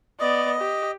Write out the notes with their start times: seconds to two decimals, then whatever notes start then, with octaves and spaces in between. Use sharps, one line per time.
0.20 B3 D5 D#5
0.60 G4